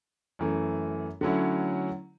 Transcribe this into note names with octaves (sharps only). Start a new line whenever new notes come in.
F#2 E3 A3
D3 F#3 A3 C#4 E4